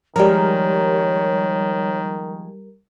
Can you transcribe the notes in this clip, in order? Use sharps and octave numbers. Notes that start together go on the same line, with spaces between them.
D#3 F3 G3 G#3 A#3 A#4 C#5